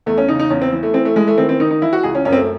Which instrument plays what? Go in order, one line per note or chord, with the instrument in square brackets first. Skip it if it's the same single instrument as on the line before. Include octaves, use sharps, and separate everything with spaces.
[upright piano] E2 A3
C#4
C#3 D#4
D#4
E2 C#4
C4
E3
A3
E3 C4
A3
E3 G#3
A3
D#3 C4
C4
D#3 D#4
D#4
E3 E4
F#4
C#2 G#4
C#4
F#2 C#4
C4
A3